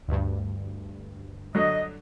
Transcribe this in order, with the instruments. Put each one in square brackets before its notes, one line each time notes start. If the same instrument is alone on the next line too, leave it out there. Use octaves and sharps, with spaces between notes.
[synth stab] D2 G2
[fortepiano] D3 F#3 [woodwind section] D#5